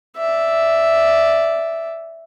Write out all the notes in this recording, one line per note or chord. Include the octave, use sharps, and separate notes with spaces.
D5 E5